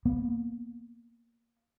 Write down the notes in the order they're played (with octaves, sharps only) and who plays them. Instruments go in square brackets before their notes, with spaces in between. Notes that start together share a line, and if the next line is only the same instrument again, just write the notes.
[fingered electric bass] A#3 B3